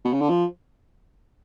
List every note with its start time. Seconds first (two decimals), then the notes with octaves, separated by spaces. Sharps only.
0.05 B2
0.13 C#3
0.21 D3
0.29 F3